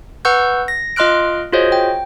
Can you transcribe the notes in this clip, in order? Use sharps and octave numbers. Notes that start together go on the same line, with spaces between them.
B4 F#5 C#6 E6 G6
A#6
F4 D#5 C6 F6 F#6 D7
F4 F#4 G#4 C5 C#5 D#5
G5